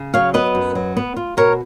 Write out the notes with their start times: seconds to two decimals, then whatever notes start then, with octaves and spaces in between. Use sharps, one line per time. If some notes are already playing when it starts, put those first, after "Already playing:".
Already playing: C#3
0.14 F#3 C#5 F5
0.34 B3 B4 D#5
0.55 F#2
0.75 F#3
0.97 B3
1.16 F4
1.37 B2 A#4 C#5